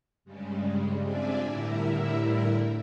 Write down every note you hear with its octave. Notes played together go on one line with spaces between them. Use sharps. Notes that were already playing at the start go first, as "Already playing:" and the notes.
G2 C#3 G3 G#3
C4 D4 F4 D5 E5 G#5
A2 D3 G3 E4 A#4 E5